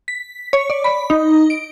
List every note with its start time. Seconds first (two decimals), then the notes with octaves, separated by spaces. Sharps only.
0.08 B6
0.53 C#5
0.70 D5
0.84 B5
1.10 D#4
1.50 D7